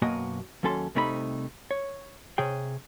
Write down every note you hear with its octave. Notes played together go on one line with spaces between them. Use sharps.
F#2 B2 A#3 F#4 D#5 G#5
D#2 F#3 C#4 A4 A5 C6
C2 C3 A3 D#4 G#4 B5
C#5
C3 G#4 C#5 G5